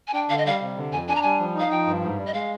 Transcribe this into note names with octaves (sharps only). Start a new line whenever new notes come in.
G#5
D4 G5
D3 F5
D#5
G3 F5
C3
D3
F2 G#5
D4 G#5
A#5
G3 G#5
F3
D#4 F5
F3 G5
G2
G#2
G3
D#5
G#3 F5